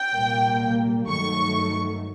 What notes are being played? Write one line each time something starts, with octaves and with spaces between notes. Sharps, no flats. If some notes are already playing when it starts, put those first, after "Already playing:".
Already playing: G5
C2 A#2 G3 A#3
G2 D#3 F#3 A3 C#6